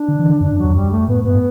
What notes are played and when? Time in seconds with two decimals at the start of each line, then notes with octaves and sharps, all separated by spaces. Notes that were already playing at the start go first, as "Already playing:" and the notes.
Already playing: D4
0.08 D3
0.19 E3
0.30 D3
0.41 F#2 D4
0.52 F#2
0.58 F#3
0.64 E2
0.75 F#2 G3
0.91 A3
1.08 A2 B3
1.24 G2 B3